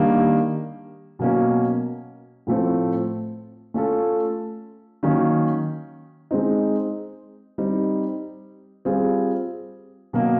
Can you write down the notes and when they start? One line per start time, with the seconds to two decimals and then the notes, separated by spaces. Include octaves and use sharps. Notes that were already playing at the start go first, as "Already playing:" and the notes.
Already playing: D#3 G3 A#3 D4 G4
1.19 B2 F#3 A#3 C#4
2.47 A2 F3 A3 C4
3.74 A3 C#4 F4 A4
5.03 D#3 F#3 A#3 C#4
6.31 G#3 C4 D#4
7.58 G3 C4 D#4
8.85 G3 C4 F4 G#4
10.13 B2 F#3 A#3